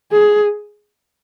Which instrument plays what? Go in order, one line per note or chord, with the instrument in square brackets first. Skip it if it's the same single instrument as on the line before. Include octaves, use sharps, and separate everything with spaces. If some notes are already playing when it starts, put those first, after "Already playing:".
[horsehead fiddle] G#4